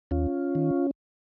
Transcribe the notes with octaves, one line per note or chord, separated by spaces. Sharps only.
D#2 C#4 F4
D#3